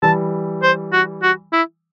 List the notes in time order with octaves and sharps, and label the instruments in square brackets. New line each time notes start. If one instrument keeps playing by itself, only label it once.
[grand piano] E3 G3 [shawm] A5
[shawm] C5
F#4
F#4
E4